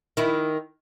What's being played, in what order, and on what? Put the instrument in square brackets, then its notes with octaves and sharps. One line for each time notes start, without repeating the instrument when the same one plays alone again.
[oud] D#3 E4